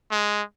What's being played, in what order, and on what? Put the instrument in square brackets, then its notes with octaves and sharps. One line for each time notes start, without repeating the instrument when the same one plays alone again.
[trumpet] G#3